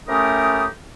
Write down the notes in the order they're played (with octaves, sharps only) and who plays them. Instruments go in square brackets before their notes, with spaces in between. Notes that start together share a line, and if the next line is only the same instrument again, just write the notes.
[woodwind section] A2 A3 C#4 G4 A#4 D#6